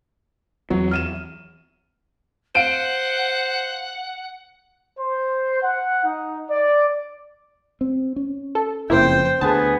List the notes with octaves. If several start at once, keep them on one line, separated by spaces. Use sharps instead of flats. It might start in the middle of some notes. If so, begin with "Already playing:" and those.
E2 E3 F#3 C4
F6 D#7 E7
C5 F5 F#5 D7
C5
F#5
D#4
D5
C4
C#4
A4
F#1 F2 C#3 A#3 E4 C5 G5
D2 D3 B3 G#4 G#5 A5